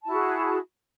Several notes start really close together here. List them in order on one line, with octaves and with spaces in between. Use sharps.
A5 E4 F#4 G#4